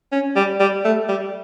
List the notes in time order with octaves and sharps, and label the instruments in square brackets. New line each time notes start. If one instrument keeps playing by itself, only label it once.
[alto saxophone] C#4
G3
G3
A3
G3